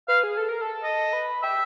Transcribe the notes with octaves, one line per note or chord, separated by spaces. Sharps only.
B4 F5
G#4
A4
A#4
A4
D#5
B4
G4 E5